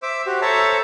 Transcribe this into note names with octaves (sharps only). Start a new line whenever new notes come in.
C5 E5 D6 E6
F#4 G4 C5
A4 C5 C#5 E5 A5 A#5